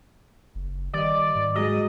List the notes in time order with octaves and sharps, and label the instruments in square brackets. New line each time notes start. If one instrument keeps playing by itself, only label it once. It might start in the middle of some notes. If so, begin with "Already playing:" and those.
[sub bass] F#1
[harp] G2 D#5 [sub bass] D#3 [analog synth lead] D5
[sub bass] G#2
[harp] F#3 G#3 F#4 [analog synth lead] D#5